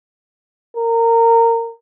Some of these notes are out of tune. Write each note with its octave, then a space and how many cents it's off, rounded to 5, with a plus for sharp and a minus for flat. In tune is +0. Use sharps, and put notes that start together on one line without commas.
A#4 -20